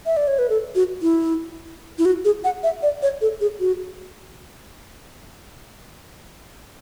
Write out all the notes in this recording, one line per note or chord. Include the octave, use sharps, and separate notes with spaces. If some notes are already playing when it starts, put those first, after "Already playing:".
E5
D5
C#5
B4
A4
F#4
E4
E4
F#4
G#4
F#5
E5
D5
C#5
A4
G#4
F#4